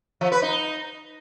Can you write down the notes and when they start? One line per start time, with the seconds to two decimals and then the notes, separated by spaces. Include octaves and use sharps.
0.21 F3
0.32 B4
0.42 D#4